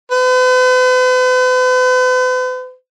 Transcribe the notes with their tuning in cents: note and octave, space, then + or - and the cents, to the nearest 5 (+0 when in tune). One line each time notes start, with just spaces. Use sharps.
B4 +45